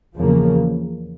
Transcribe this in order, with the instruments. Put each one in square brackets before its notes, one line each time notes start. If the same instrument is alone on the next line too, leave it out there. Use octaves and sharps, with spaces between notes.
[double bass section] E2 C#3 F3 A#3